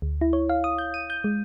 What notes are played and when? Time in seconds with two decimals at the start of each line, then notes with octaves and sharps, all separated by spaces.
0.02 D2
0.21 E4
0.33 C#5
0.49 F5
0.64 D#6
0.78 G6
0.94 D#7
1.10 G6
1.24 G#3